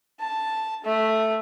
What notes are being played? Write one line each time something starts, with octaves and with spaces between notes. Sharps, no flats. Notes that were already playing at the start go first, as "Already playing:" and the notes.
A5
A3